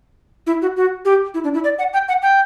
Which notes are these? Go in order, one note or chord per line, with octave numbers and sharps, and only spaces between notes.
E4
F#4
F#4
G4
E4
D4
E4
D5
F#5
G5
F#5
G5